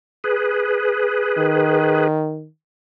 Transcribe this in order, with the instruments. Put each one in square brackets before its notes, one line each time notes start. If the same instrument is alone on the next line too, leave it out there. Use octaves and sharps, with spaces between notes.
[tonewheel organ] G#4 B4
[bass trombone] D#3